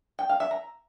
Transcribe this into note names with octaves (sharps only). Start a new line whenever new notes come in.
G5
F5
E5
A#5